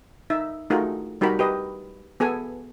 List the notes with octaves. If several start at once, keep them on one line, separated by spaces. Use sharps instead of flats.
D#4 E5
A3 D#4 F4 F#4 G#4 A#4
G3 D#4 F#4 G4 A#4 B5
G4 B4 D#5
B3 G#4 A4 G#5